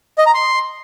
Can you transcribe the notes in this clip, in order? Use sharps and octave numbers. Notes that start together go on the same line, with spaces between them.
D#5
A#5
C6